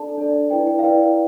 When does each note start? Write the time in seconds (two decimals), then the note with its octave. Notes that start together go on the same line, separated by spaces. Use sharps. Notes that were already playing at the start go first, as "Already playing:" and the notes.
Already playing: D4 A4 D5 A5
0.18 D4 A4 D5
0.51 E4 B4 D5 G5
0.67 G5
0.79 F5
0.84 E4 B4 D5 G5